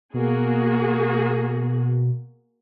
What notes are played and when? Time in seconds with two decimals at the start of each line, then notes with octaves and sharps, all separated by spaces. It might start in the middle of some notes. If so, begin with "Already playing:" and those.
0.14 B2 A#3 F#4 G#4